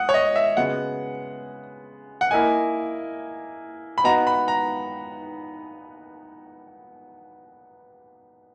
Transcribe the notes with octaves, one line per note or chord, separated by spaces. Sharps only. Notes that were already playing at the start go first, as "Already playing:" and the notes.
Already playing: F#5 D#6
C#5
D#5
E5
C#3 G#3 B3 F#4 F#5
F#5
A#3 E4 A#4 D#5 G#5
B5
B3 D#4 F#4 A#5
B5
A#5